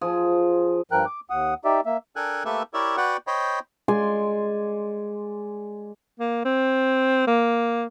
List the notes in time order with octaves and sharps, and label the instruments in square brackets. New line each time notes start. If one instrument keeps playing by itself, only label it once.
[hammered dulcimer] F3 G#4
[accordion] G2 F3 A#4 G5 F#6
D6
D#2 F#5 D#6
D#4 G4 D5 E5
A#3 E5
[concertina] D4 A4 A#4 G5 G#5 F#6
A3 A#3 G4 A4 B4 E5
E4 G4 A#4 C#5 D5 E5
F#4 B4 D5 F#5 G5
C5 C#5 D#5 G5 B5
[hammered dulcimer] G#3 D5 G#5 C6
[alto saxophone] A#3
C4
A#3